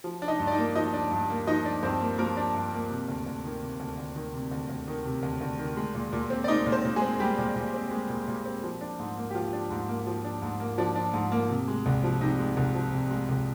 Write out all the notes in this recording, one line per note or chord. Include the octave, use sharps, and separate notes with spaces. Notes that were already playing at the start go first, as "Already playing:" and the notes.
F3
D4
D#4 D#5
G2
D5
D#4 D#5
A#3
F3 D#4 D#5
D4
G2
A#3
F3 D#4 D#5
D4
G2 C4 C5
A#3
F3 A#3 A#4
D4
G2
A#3
C3
D2
D2
D#3
C3
D2
D2
D#3
C3
D2
D2
D#3
C3
D2
D2
D#3
G#3
A#2
A#2
C4
D5
G#3 D#4 D#5
A#2
C4 C5
A#2
G#3 G#4
C4
G3 G#3 G4
A#2
A#2
C4
G#3
A#2
A#2
C4
F3
D4
G#2
A#3
G4
F3 F4
D4
G#2
A#3
F3
D4
G#2
A#3
F3 D4
D4
G#2
A#3
C3
G#3
C2
F3
C3 D#4
G#3
C2
F3
C3
G#3
C2